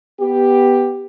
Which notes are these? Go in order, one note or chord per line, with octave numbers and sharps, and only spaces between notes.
B3 G4